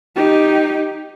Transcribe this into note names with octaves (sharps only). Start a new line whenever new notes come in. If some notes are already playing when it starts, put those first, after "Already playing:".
D#4 G4